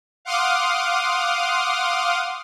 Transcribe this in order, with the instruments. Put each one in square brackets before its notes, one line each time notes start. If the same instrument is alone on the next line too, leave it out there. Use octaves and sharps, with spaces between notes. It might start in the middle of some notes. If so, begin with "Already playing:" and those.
[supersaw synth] F5 F#5 C6 D6 D#6 F6